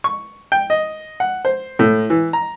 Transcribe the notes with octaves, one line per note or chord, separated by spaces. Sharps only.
C#6
G5
D#5
F#5
C5
A2
E3
A#5